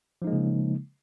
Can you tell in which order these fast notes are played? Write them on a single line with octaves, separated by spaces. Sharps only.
F3 D#4 G#3 A#3 C#3